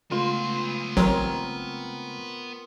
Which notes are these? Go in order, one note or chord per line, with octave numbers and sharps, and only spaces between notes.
C#3 G#3 A3 B3 F4 B4 C6
A1 F#3 C4 A#4 C#6